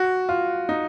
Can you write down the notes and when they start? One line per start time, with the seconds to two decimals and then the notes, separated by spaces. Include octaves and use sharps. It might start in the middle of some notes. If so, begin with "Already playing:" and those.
Already playing: F#4
0.29 F4
0.69 D#4